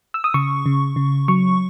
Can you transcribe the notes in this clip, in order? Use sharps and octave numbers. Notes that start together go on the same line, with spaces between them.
E6
D#6
C#3 C#6
C#3
C#3
F#3 C#6